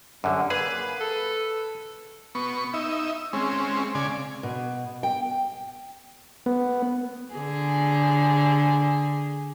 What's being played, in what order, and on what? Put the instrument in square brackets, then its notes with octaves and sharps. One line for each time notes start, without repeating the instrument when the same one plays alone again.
[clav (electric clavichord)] F#2 D3 [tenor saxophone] G3
[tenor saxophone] A#3 [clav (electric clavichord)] G#4 [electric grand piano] B4 D#7
[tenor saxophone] A4
[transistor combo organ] B3 C#6
D#4 E5
G#3 C4 C#4
C#3 D5 G#5
[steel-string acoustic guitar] B2
G5
[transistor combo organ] B3
[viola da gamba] D3 G#4